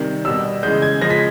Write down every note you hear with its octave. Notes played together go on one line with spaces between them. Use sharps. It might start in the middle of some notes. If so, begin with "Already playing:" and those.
Already playing: C3 D#3 G3
B2 G3 E6
C#3 E3 G#3 G6
G#6
C#3 F3 G#3 A#6
B6